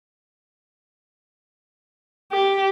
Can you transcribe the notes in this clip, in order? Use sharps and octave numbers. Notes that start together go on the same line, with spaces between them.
G4